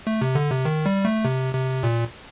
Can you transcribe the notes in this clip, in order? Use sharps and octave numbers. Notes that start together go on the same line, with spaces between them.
A3
C3
D3
C3
D#3
G3
A3
C3
C3
A#2